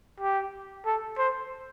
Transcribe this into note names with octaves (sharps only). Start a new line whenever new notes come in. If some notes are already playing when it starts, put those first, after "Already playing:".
G4
A4
C5